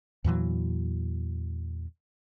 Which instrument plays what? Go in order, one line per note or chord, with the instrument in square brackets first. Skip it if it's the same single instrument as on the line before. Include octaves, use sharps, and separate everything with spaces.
[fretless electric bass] E2 A#2 E3 F#3